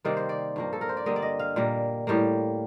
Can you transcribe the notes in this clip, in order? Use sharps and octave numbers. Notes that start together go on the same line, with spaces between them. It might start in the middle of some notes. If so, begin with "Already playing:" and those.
C3 D#3 G3 A#3 D5
C5
D5
G2 F3 A#3
A4
A#4
C5
D5
D3 G3 A#3 D#5
D5
D#5
F5
A#2 G3 A#3
A2 G3 A#3